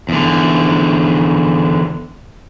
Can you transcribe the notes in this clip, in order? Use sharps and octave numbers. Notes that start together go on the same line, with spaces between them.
E2 D3